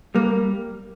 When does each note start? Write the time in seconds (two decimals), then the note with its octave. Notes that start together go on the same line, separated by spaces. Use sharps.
0.15 G3 A#3